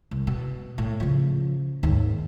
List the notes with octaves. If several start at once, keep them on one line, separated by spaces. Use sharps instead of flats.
C2
B2
A2
C#3 F3
D#2 G#2